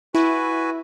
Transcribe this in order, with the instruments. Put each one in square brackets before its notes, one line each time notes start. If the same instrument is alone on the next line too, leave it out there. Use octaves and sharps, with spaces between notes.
[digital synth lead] E4 [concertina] F#4 B4 G#5